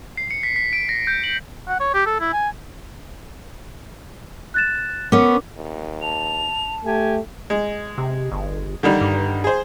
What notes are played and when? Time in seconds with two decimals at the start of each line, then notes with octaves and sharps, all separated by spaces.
0.17 C7
0.31 C#7
0.43 B6
0.56 B6
0.73 D7
0.89 A#6
1.07 G6
1.24 F#7
1.68 F#5
1.80 C#5
1.94 G4
2.06 A4
2.20 E4
2.33 G#5
4.54 F#6 A6 E7
5.12 B3 C#4 A#4 D6
5.57 D#2
6.02 A5 F7
6.85 A3 G4 G#5
7.50 G#3
7.98 C3
8.32 G1
8.83 D3 D#3 G3
9.01 G2
9.44 G#4 C5